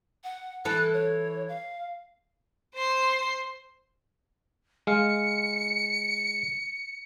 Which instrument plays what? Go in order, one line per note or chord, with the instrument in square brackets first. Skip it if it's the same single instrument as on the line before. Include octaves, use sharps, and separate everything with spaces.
[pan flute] F#5
[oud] E3 A4 [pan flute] F#6
[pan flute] C#5
F5
[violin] C5 C6
[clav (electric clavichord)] G#3 F5 [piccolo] C#7